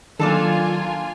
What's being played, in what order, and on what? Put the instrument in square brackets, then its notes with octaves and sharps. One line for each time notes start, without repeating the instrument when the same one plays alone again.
[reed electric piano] D#3 F#3 [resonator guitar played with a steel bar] A#3 D4 A4 [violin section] F4 G#5